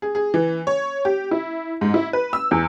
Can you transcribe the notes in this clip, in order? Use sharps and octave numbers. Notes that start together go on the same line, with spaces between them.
G#4
G#4
E3
C#5
G4
E4
G#2
E4
B4
E6
E2